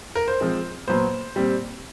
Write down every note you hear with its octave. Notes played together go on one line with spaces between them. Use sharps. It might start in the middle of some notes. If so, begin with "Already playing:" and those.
A#4
C5
F3 G#3 C4
A#2 F#3 B3 C5
A#2 G3 C4